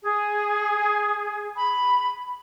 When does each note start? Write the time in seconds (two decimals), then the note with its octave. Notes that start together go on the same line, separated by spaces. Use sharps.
0.03 G#4
1.56 B5